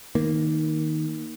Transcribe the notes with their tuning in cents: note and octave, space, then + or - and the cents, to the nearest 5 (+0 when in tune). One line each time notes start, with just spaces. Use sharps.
D#3 +5 A#3 +0